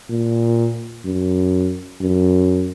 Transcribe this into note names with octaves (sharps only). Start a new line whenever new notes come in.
A#2
F#2
F#2